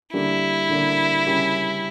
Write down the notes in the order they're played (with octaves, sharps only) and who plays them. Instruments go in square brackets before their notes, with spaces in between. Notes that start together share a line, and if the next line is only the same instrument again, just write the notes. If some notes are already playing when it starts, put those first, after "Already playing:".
[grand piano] D3 G3 A#3 D4 A#4 [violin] E4
[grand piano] D3 G3 A#3 D4 A#4
C#3 G3 C#4 G4 A#4